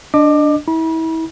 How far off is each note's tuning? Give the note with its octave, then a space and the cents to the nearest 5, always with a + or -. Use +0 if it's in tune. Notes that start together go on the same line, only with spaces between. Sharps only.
D4 +0 D#5 -25 D6 +20
E4 -30 B5 -40